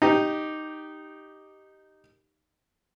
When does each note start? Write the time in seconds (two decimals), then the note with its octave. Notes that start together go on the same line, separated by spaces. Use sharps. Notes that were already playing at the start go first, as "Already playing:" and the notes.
0.02 D#4 G4